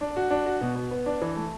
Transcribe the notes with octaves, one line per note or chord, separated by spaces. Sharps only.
D4
F#4
D4
F#4
B2
B3
B3
D4
E3
A3